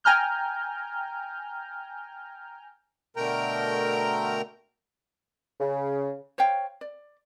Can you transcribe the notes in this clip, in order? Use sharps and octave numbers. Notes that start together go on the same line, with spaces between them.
G5 G#5 A#5 F6 G6
B2 D3 A3 A#4 G5 A#5
C#3
C5 C#5 F5 G5
D5